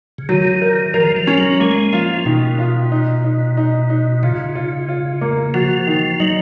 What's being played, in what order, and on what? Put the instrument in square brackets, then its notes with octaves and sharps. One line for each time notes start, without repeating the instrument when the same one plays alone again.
[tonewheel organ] C#3
[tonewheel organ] D#3 [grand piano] F#3
[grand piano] A#4
[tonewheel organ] F3 [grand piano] A#4
[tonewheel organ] F3
[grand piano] C#4
[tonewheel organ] F#3
[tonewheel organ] G#3 [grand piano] A#3
[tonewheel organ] F3 [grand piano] F4
[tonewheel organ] B2 [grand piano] D#3
[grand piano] F4
D#4
D#4
D#4
D#4
[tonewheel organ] C#3 [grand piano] F4
[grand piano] F4
F4
A#3
[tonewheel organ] F3 [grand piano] F#4
[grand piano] D#3
[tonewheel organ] F#3 [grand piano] D#4